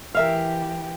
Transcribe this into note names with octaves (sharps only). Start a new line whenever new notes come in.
E3 G4 A#4 E5 F5